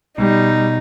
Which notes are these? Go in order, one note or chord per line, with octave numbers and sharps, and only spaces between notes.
B2 G3 D#4